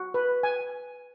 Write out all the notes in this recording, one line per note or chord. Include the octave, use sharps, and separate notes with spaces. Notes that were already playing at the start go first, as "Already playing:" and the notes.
Already playing: F#4
B4
G#5